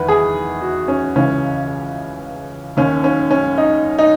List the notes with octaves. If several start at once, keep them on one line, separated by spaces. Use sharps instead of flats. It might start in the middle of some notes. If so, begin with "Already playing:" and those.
Already playing: E2 D#3 B4
G#4
F#4
C#4
C#2 C#3 E3 C#4
D#2 D#3 C#4
C#4
C#4
D#4
D#4